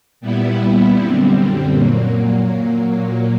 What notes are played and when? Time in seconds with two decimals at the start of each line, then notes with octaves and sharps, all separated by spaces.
0.21 A#2 G3 B3 E4
0.96 F#2 D3 G3 C4
1.71 A#2 F#3 A#3